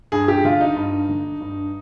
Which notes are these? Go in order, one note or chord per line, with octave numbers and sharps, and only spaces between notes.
G2 G#4
G4
D3 F4
D#4
G2
D3
G2